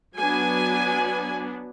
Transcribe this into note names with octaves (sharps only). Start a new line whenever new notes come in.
F#3 B3 D4 G#5